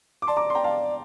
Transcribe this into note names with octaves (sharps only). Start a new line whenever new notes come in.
D6
D5 A5 C6
A#5 D6
C6
G5 A#5
F5 A5